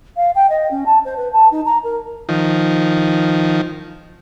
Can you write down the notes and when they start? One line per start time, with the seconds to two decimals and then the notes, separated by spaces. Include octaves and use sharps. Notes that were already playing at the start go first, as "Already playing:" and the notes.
0.16 F5
0.35 G5
0.50 D#5
0.71 C#4
0.86 A5
1.05 C5
1.17 B4
1.32 A5
1.51 D#4
1.65 A#5
1.83 A#4
2.29 D#3 F3